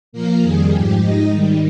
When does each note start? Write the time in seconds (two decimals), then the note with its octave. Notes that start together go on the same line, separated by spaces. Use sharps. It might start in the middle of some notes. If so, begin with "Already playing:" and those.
0.13 A#2 F3 A#3 A#4
0.42 F2 D#3 G3 G#4
0.72 G#2 F3 G4
1.00 G#2 F3 D#4 D#5
1.30 G#2 D#3 G3